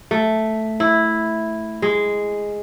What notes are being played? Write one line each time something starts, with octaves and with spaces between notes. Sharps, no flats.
A3
E4
G#3